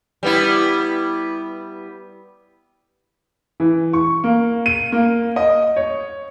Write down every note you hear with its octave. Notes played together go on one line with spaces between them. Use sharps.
G3 B3 E4
E3
C#6
A#3
D#7
A#3
D#5
C#5